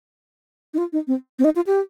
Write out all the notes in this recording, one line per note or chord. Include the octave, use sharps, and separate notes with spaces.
D#4
F4
D#4
C4
C4
D#4
F4
G4